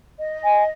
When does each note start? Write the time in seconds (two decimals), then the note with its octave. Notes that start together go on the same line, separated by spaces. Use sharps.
0.19 D#5
0.44 G#5